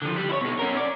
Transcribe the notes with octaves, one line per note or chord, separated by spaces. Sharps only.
D3 F3
G3
E4 C#5
B2 D#4
C#4 A#4
D5